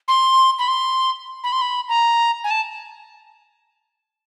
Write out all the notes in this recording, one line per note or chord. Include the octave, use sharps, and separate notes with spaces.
C6
B5
C6
B5
C6
B5
A#5
G#5
A5